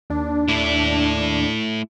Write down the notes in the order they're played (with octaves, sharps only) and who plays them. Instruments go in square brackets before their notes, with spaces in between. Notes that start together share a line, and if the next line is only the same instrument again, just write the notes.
[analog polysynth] D#2 D4
[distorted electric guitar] A3 E4